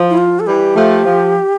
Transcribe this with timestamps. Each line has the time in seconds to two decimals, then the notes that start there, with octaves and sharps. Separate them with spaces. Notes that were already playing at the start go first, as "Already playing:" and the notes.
Already playing: F3
0.10 E4
0.17 F4
0.40 A4
0.46 E3 G3 G4
0.76 F3 A3
1.05 F3